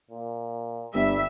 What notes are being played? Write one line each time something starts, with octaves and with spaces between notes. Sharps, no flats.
A#2
G1 G3 E5